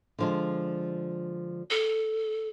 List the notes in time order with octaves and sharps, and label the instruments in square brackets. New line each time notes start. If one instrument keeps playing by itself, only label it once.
[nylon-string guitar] D3 F3 G#3
[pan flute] A4